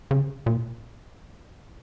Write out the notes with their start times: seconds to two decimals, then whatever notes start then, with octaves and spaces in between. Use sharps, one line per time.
0.11 C#3
0.46 A#2